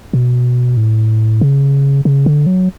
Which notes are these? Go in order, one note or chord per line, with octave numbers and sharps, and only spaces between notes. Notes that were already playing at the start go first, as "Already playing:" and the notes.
B2
A2
C#3
C#3
D3
F#3